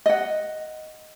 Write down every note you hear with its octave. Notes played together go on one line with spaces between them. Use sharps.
D#5 F#5